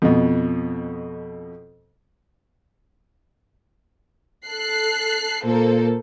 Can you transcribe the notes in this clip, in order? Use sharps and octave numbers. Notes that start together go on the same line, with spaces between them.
F2 B2
A4 F#6 C7
A#2 A#3 A4 C5